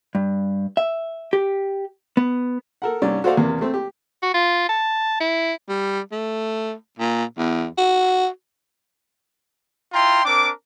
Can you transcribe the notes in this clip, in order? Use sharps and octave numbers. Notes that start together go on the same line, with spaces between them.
G2
E5
G4
B3
A4 A#4 F#5
C2 G2 C#4 D5
F#4 A4 C5 D5 F5 F#5
E2 C3 A#3
A3 C4
G4
F#4
F4
A5
E4
G3
A3
A#2
E2
F#4
E4 F4 G5 A#5 C6
C4 D4 A#4 D6